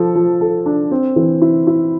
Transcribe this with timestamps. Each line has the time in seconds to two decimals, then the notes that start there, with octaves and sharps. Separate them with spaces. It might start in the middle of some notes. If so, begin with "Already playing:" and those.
Already playing: F3 A4
0.15 F3
0.41 A4
0.66 D4
0.91 C4
1.16 E3
1.42 E4
1.67 E4